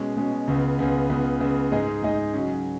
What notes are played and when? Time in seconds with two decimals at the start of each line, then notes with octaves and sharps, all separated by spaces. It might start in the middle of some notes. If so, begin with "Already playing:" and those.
Already playing: B2 G#3 C#4
0.16 B2 G#3 C#4
0.48 C#2 C#3 B3
0.79 C#2 C#3 B3
1.10 C#2 C#3 B3
1.40 C#2 C#3 B3
1.72 G#2 G#3 D#4 G#4 D#5
2.03 G#2 G#3 D#4 G#4 D#5
2.33 C#3 F#3 C#4